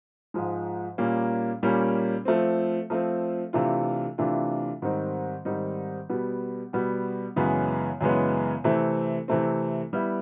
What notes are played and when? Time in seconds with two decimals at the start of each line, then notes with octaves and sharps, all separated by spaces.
0.34 G#2 F3 G#3
0.98 A#2 G3 A#3 C#4
1.63 A#2 G3 A#3 C#4
2.25 F3 A3 C4
2.90 F3 A3 C4
3.53 C3 E3 A3 D4 F4
4.18 C3 E3 A3 D4 F4
4.82 G#2 D#3 G3 C4 D#4
5.45 G#2 D#3 G3 C4 D#4
6.10 B2 G3 B3
6.73 B2 G3 B3
7.36 F#2 C#3 E3 G#3 B3
8.01 F#2 C#3 E3 G#3 B3
8.64 C3 E3 A3 C4
9.28 C3 E3 A3 C4
9.93 G3 B3 E4